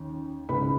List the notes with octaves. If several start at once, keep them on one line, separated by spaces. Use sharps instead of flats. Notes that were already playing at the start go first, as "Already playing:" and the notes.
Already playing: D#2 D#3 C#4
C#2 C#3 G#3 D#4 B4 B5